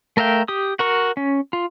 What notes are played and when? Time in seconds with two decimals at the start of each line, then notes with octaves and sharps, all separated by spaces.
0.17 A3 A#4 E5 F5 G5
0.48 G4 D#6
0.79 F#4 A#4 C#6
1.17 C#4
1.53 F4